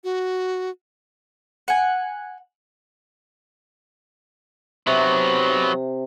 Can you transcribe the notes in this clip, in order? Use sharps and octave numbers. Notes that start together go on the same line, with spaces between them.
F#4
F#5 G#5
C3 F#3 B3